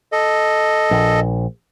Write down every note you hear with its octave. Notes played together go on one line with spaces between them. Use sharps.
A4 D#5
A#1